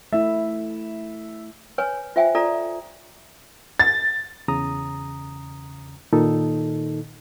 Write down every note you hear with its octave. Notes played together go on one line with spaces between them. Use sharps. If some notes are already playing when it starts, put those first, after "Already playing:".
A3 E4 E5
B4 C#5 G#5
F4 C5 E5 G5 G#5
F4 A4 D5 A#5
A6
E2 C#3 A#5 D#6
A#2 D#3 D#4 A4